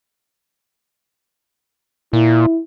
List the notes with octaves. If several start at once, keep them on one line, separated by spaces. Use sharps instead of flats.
A#2 E4